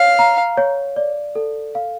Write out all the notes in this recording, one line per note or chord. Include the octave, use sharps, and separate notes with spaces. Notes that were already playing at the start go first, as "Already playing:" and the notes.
Already playing: C#5 F5
A#5
C#5
D5
A4
F5